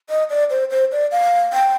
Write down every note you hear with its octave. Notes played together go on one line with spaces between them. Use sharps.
D#5
D5
C5
C5
D5
F5
G5